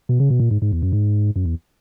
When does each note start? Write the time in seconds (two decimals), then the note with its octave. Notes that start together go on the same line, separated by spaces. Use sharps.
0.09 B2
0.20 C#3
0.30 B2
0.40 A#2
0.51 G#2
0.62 G#2
0.72 E2
0.82 F#2
0.93 G#2
1.36 F#2
1.45 E2